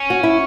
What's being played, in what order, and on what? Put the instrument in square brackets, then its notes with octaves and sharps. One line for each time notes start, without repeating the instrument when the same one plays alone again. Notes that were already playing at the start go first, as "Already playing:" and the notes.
Already playing: [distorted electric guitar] C#4
[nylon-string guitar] F#4
E4